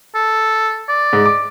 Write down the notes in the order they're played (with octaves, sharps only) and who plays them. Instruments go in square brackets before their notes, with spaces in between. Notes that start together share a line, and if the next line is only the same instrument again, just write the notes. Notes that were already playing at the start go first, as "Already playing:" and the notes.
[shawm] A4
D5
[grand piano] G#2
D6